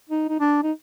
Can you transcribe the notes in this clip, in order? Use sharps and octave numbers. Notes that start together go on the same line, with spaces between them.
D#4
D#4
D4
D#4